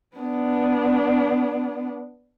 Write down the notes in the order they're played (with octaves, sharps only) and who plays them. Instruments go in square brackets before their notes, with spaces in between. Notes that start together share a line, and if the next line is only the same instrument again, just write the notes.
[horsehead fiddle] B3 D4